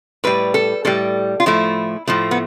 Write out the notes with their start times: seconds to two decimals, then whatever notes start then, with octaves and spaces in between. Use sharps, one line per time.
0.24 A2 G3 B4
0.54 A4
0.85 A2 G3 A4
1.40 F4
1.46 A2 F3 A3 E4
2.07 A2 F3 A3
2.31 B3